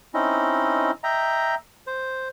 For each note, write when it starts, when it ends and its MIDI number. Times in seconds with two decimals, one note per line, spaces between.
0.14 0.91 60
0.14 0.91 61
0.14 0.91 63
0.14 0.91 64
0.14 0.91 75
1.04 1.55 75
1.04 1.55 76
1.04 1.55 79
1.04 1.55 82
1.87 2.28 72